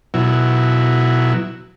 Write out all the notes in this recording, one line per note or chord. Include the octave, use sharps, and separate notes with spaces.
B2 F#3 E4